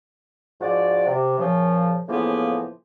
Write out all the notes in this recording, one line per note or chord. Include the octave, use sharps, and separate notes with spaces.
G#2 F3 F#4 D5
C3
A#2 C#3 F3
A2 C#3 E3 F3 A#3 B3